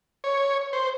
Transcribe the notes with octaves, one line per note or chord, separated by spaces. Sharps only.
C#5
C5